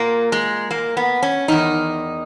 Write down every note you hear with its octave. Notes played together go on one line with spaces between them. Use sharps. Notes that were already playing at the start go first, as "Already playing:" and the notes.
Already playing: A#2 A#3
G#3
A#3
B3
C#4
E2 D#3 D#4